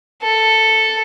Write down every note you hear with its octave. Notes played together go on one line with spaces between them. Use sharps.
A4